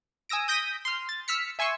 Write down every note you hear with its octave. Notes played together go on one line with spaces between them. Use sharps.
G#5 D#6 E6 A#6 D7
D#6 G6 A#6 B6 D7 D#7
C6 F6
A6
E6 F6 B6 C#7
E5 G#5 C6 C#6 E6 C#7